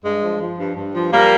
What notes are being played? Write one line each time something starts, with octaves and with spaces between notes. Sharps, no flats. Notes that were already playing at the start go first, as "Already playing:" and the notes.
G2 G#3
F3
F3
G2
G2
F3
F3 G3 A#3